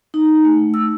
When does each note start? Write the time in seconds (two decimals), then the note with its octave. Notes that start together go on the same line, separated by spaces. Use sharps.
0.14 D#4
0.45 A3
0.74 E6